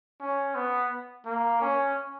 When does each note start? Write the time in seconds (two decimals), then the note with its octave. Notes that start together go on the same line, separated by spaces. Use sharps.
0.20 C#4
0.55 B3
1.25 A#3
1.61 C#4